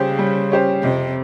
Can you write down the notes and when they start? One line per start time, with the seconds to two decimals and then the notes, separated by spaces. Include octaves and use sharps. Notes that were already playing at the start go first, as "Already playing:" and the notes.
Already playing: C#3 G3 C#4 G4 C5
0.18 G3
0.51 C#4 G4 C5
0.83 F2 C3